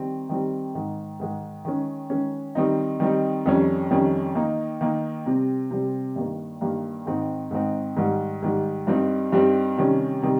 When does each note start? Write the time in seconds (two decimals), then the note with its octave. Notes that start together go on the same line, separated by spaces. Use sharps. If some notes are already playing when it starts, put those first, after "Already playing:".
Already playing: D#3 G3 C4
0.29 D#3 G3 C4
0.75 G#2 D#3 G#3
1.20 G#2 D#3 G#3
1.65 D#3 G#3 C#4
2.10 D#3 G#3 C#4
2.55 D#3 G3 C4 D#4
3.00 D#3 G3 C4 D#4
3.46 F2 D#3 G3 C#4
3.91 F2 D#3 G3 C#4
4.35 D#3 A#3 D#4
4.81 D#3 A#3 D#4
5.26 C3 G3 C4
5.71 C3 G3 C4
6.16 G2 D#3 A#3
6.61 G2 D#3 A#3
7.06 G#2 D#3 G#3 C4 D#4
7.51 G#2 D#3 G#3 C4 D#4
7.97 G#2 D#3 G3
8.42 G#2 D#3 G3
8.87 G2 G3 C4 D#4
9.32 G2 G3 C4 D#4
9.77 C3 D#3 G3 C#4
10.22 C3 D#3 G3